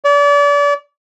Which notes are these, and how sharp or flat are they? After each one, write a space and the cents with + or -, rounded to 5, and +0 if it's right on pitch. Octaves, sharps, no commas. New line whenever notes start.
D5 -35